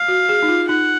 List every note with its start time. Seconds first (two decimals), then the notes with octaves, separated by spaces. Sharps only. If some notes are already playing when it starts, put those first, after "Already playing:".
Already playing: F5
0.08 F#4
0.29 G#4
0.43 D#4
0.48 F4
0.69 D#4 F#5